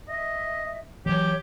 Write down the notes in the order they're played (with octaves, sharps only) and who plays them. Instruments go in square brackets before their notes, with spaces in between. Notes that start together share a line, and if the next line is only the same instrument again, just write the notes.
[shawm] D#5 [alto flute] E5
[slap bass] E3 F#3 [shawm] G4 [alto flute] C#5